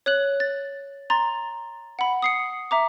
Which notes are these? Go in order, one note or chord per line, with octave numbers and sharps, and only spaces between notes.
C#5 F#6 F#7
A6
A#5 C6 A6
F#5 B5
D#6 C7 C#7
E5 A#5 D6